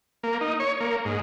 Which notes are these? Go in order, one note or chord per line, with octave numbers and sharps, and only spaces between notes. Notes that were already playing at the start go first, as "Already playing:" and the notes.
A#3
D#4
C#5
A#3
G#2